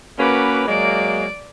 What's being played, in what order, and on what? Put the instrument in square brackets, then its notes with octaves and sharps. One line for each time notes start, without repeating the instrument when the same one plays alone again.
[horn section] A#3 C#4 B4 [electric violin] F#4 D6
[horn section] F#3 G#3 A#3 [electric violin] D5 D7